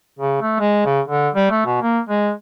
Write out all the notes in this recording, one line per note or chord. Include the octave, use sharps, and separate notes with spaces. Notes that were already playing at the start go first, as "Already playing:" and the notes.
C#3
A3
G#3
C#3
D3
G3
A3
B2
A#3
G#3